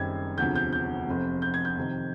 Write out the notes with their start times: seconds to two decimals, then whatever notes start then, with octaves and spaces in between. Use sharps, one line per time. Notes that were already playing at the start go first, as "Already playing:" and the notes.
Already playing: F#1 F#2 D#3 G3 C4 G#6
0.38 E1 D2 C3 F3 G6
0.56 G6
0.73 G6
1.08 F1 F2 C3
1.42 G6
1.54 G#6
1.65 G6
1.77 F2 C3 D#3